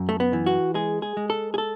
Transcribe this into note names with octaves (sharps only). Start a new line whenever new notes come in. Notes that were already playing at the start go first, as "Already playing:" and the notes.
Already playing: F#2
A3
B3
E3
F#4
G#3 G#4
G#4
G#3
A4
G#4
A4